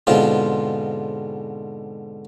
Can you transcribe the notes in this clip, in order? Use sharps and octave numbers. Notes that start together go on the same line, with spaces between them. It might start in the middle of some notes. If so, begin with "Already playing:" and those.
G#2 B2 D3 C4 F4